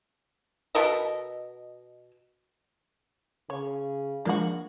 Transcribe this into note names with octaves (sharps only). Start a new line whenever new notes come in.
B2 A4 A#4 D#5
C#3 C#5
F3 G#3 A#3 D4 F#4